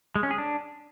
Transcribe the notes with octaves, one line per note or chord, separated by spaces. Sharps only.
G#3
C#4
G#4
D4